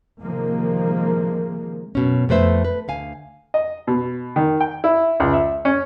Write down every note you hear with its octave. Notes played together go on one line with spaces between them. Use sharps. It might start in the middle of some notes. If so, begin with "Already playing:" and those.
C3 D#3 F3 G#3 A#3
F#2 B2 C#4
F2 A3 B4 C5 E5
B4
D2 F5 G#5
D#5
B2
D#3
G5
E4
C#2
E5
C#4